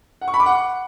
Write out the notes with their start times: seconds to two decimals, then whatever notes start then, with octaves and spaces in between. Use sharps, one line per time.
0.21 F#5
0.28 C#6
0.34 B5
0.40 D6
0.46 F#5